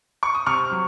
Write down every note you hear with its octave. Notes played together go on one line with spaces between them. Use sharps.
C#6
D#6
C3 C#6 F6
F#3